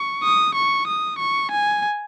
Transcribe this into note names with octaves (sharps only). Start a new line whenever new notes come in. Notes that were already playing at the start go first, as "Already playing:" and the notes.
Already playing: C#6
D#6
C#6
D#6
C#6
G#5